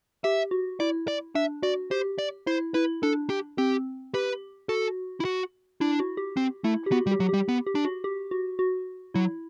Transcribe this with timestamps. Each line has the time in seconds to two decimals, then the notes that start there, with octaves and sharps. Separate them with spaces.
0.24 G4 E5
0.51 F#4
0.80 E4 D5
1.08 D5
1.35 D4 E5
1.63 F#4 D5
1.91 G4 C5
2.18 D5
2.47 E4 C5
2.74 E4 B4
3.03 D4 A4
3.30 G4
3.58 C4 G4
4.14 G4 B4
4.69 F#4 A4
5.20 E4
5.25 F#4
5.81 D4 E4
6.00 F#4
6.17 G4
6.37 C4
6.64 A3 E4
6.86 G4
6.92 B3 F#4
7.07 G3
7.11 G4
7.20 F#3
7.29 G4
7.34 G3
7.49 B3
7.67 G4
7.75 D4
7.85 F#4
8.04 G4
8.31 F#4
8.59 F#4
9.14 F#3 E4